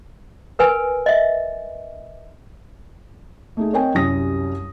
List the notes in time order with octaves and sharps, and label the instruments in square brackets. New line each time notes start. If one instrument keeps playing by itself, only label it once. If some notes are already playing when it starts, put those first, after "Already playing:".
[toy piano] A#4 B4 G#5
D#5 E5
[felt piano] A3 D#4 G#4
C4 A#4 C#5 D#5 G5 G#5
C2 F#2 G3 C#4 D#6 A#6